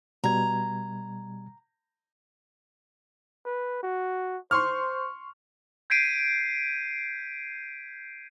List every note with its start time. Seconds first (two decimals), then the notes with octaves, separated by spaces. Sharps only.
0.24 B2 G3 A#5 G#6
3.45 B4
3.83 F#4
4.51 C5 C6 C#6 F6
5.90 G6 G#6 B6 C7 D7 D#7